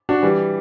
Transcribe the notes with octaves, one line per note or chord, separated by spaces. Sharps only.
D4 F#4
E3 G3